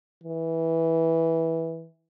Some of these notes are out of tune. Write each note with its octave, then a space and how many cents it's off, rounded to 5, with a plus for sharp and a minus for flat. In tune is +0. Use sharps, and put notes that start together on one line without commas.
E3 -10